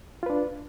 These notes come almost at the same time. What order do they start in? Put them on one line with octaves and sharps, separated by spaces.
F4 B4 D4